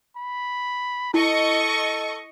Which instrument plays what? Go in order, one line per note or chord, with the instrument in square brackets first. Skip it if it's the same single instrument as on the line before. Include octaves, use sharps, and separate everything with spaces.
[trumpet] B5
[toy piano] E4 [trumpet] A4 [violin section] D#5 C#6